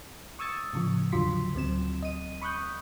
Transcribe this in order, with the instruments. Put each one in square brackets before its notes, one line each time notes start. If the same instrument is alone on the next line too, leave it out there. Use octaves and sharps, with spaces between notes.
[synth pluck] C#6 D#6 E6 G#6 A6 C#7
A2 C#3 F3
E2 D3 F#3 F4 C6 B6
D2 F#3 C4 E7
D#5 D#7
B5 C#6 D#6 F#6 G6